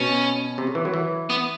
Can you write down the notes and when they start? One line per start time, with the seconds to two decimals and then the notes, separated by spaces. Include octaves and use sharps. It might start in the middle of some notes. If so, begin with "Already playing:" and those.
Already playing: B2 C#4
0.58 C3
0.67 C#3
0.75 E3
0.85 F#3
0.94 E3
1.30 B3